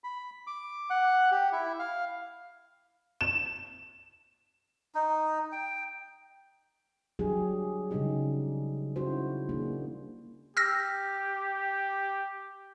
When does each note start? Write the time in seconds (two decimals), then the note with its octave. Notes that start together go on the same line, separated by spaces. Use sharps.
0.04 B5
0.47 D6
0.90 F#5
1.31 G4
1.52 E4
1.79 F5
3.21 E7
4.95 D#4
5.52 G5
7.19 F#3 G3 D4 G4 G#4
7.91 C#3 G3 G#3 D#4 G4
8.96 C#4 D#4 E4 F#4 C5
9.49 A#3 D4 G#4
10.57 G4 E6 F6 A#6